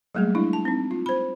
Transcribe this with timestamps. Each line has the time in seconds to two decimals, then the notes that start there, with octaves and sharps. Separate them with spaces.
0.15 F#3 G3 A3 A#3 G#4
0.35 G#3 D4 E4
0.53 A5
0.65 C4 D#4
0.91 F4
1.06 C5 B5